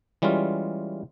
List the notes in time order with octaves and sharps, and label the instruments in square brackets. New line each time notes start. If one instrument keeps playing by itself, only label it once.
[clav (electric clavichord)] E3 G3 G#3 C#4 F4